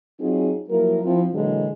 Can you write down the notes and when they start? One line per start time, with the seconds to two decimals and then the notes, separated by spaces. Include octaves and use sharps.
0.19 F#3 C4 D#4 F4 G#4
0.69 F3 F#3 A#3 E4 A#4
1.03 F3 C4 E4
1.32 A#2 D3 E3 F#3 G#3